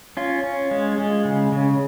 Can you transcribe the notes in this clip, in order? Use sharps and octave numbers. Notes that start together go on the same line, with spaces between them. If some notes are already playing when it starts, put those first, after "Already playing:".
C#4 F4
C#4
G#3
G#3
C#3
C#3